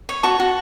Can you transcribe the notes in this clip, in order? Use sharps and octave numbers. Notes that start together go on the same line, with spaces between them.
C#5
F#4 A5 C#6
F#4